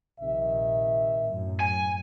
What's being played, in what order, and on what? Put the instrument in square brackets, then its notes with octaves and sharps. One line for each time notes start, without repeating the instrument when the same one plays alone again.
[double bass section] A#1 [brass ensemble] C3 D#3 E5
[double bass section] F#2 A2
[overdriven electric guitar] G#5